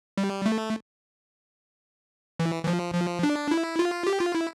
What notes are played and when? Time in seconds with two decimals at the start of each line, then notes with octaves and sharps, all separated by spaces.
0.18 G3
0.46 A3
2.39 E3
2.64 E3
2.67 F3
2.95 F3
3.23 D4
3.51 E4
3.79 F4
4.07 G4
4.20 F4
4.35 E4